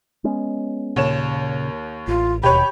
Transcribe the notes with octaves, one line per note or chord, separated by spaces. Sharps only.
G#3 B3 C#4
D#2 A#2 C#3 C#5 E7
A1 F4
E1 D#2 B2 G4 C#5 B5